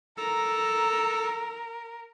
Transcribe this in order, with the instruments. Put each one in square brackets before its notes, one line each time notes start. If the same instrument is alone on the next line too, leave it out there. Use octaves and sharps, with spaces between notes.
[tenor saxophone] A4 [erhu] A#4 [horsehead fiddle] A#5